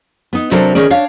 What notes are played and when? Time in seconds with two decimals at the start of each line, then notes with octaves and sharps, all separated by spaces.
0.33 B3 D#4
0.51 C3 F#3 D4 A4 A#4
0.75 D#3 C#4 G#4 A#4 D5
0.90 D4 C#5 F5